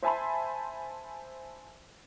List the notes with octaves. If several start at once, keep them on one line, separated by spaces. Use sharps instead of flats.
C5 E5 G#5 A5 B5 C6